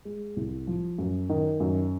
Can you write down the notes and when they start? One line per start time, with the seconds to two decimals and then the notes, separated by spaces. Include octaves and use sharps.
0.05 G#3
0.36 C2
0.67 F3
0.98 F#2
1.29 D#3
1.60 F#2